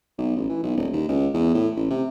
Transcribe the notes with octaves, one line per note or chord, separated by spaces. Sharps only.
B1
A1
E3
B1
D#1
D#2
C#2
E2
A2
A1
C3